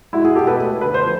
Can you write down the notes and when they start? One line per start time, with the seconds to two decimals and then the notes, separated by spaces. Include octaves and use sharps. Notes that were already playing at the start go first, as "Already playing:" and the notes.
0.13 G#3 E4 F#4
0.25 F#4 G#4
0.35 B2 G4 A4
0.47 A4 B4
0.59 A3
0.81 D3 B4
0.94 C5
1.04 F3